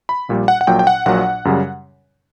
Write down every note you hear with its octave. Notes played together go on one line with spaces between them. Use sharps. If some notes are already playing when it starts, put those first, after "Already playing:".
B5
A#1 A#2 G3
F#5
F#5
A#1 A#2 F#3 G5
G5
F#5
A#1 A#2 F#3 F#5
F#2 C#3 G3